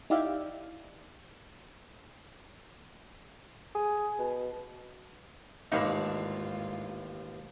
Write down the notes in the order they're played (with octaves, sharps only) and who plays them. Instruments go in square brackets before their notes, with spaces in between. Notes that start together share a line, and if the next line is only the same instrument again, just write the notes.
[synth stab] D#4 E4 G4 D5 E5 F5
[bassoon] G#4
B2
[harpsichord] A1 D#2 D4 [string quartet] G#2 F4 [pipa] D#4 F5 B5